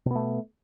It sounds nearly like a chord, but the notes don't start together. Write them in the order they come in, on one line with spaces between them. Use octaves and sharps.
B2 B3 A3